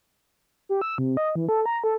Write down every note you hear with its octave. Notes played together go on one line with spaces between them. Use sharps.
G4
E6
C3
D#5
E3
A4
A#5
A4